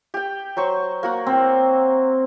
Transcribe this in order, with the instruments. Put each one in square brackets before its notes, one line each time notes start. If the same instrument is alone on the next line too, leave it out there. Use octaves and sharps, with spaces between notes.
[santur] G4 G5
F#3 C5 C#6
A#3 F#4 F#5
[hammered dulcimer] C4